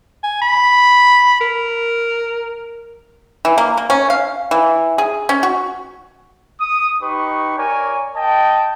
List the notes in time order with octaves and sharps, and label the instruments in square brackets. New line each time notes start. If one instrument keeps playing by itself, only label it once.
[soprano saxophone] G#5
B5
A#4
[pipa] E3
A#3
A#3
C#4
F5
E3
G#4
C#4
F#4
[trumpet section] D#6
D#4 G4 B4 C#6
A#4 C#5 D5 G#5
D#5 G5 A5